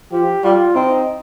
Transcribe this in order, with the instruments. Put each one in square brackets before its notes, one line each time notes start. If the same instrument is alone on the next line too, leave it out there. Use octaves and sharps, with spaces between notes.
[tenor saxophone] F3 [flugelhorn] G4
[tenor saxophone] G3 [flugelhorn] F4
[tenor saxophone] C4 [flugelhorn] D#4